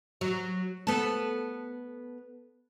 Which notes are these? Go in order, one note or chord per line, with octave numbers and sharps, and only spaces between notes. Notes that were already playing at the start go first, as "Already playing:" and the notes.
F#3
B3 A4